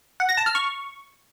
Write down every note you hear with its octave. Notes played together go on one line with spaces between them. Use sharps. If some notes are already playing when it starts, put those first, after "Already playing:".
F#5
A#6
A5
F6
C#6